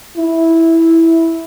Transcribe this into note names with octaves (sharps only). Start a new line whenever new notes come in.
E4